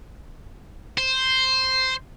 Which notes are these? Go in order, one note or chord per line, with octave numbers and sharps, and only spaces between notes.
C5